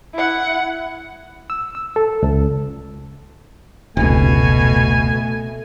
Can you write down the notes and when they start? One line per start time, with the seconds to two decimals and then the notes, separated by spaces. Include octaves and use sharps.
0.14 E4 F#5
1.50 E6
1.75 E6
1.96 A4
2.23 C#2
3.97 F1 C#2 B2 A3 G#5